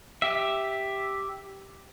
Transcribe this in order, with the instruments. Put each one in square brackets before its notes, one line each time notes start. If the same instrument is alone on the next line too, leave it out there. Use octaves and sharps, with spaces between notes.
[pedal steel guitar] G4 E5